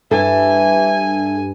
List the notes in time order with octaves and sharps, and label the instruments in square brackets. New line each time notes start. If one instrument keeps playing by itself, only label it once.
[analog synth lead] G2 [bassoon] E3 [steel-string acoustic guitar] A4 E5 [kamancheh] G#5